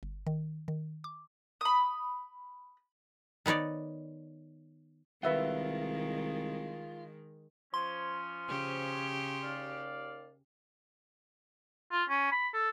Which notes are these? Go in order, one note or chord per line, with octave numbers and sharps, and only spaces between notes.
G1
D#3
D#3
D6
B5 D#6
D#3 B3 D#4 C#5 D5
C2 D#3 G#3 F4 B4 E5 F#5
F3 C#4 C6
C#3 G4
D#2 D5 F5
F4
C#4
B5
A4